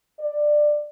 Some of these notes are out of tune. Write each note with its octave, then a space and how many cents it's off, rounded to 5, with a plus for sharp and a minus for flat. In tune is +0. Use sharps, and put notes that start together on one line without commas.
D5 +15